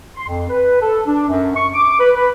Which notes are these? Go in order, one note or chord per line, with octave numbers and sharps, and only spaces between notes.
C6
F2
B4
A4
D4
F#2
C#6
D6
B4
B4